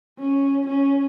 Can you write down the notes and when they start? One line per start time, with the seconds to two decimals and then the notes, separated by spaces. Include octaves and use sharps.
0.19 C#4
0.67 C#4